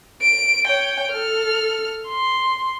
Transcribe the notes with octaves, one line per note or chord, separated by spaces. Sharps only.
D7
C#5 G5
A4 F6
C6